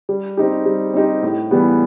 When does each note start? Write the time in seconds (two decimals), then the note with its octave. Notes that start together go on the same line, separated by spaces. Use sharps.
0.09 G3
0.37 C4 D#4 G4
0.66 G3
0.94 C4 D#4 G4
1.23 A2
1.51 E3 G3 B3